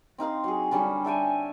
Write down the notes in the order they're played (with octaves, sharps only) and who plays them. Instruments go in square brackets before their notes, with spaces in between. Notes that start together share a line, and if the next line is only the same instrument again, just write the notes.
[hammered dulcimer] C4 D#4 F5 C6
F#3 G#4
D3 G3 C#4 B5
A4 E5 G5 G#5